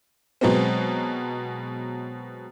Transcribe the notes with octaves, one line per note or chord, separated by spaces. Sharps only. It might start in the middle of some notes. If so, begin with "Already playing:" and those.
B2 F#3 G#3 B3 C4